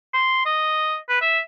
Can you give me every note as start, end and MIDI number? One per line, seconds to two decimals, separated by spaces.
0.13 0.42 84
0.46 0.97 75
1.09 1.18 71
1.21 1.39 76